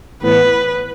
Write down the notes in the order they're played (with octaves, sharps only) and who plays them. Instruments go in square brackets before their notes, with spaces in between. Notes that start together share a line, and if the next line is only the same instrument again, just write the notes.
[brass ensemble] A2 E3 B3 [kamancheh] B4